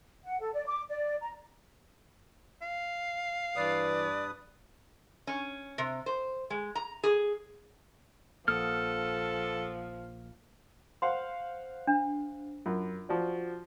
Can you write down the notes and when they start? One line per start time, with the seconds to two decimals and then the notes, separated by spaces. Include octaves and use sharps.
0.24 F#5
0.41 A4
0.54 D5
0.67 D6
0.90 D5
1.22 A#5
2.62 F5
3.56 G2 E3 B4 D5 D#6
5.27 C#4
5.78 C3
6.06 C5
6.50 G#3
6.75 A#5
7.04 G#4
8.48 A#1 F3 A#3 A4 F#5 D#6 F6
11.02 C5 F5 F#5 C6
11.87 D4
12.66 F#2 F4
13.09 F3 F#4 D5